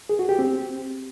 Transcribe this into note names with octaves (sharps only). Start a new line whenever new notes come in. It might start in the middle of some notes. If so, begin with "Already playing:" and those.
G#4
F#4
G4
C4